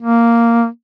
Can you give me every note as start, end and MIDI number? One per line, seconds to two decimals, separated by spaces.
0.02 0.66 58